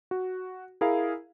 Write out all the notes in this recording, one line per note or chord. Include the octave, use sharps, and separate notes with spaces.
F#4
E4 G#4 A#4 F5